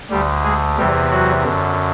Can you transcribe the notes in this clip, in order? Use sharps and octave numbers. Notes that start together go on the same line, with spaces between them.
D2 D3 G3 G4
G#3 G#4
E2 C3 E3 G3 G4
F#3 F#4
F#2 D3